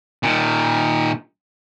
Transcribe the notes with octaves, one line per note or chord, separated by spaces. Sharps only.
A#2 D#3